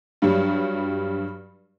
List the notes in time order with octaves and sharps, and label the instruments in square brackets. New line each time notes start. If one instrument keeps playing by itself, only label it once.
[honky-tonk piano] G2 F#3 G3